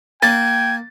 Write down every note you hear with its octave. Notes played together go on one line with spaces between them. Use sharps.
A#3 G5 G#6 A6